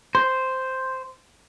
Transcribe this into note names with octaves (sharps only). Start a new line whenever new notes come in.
C5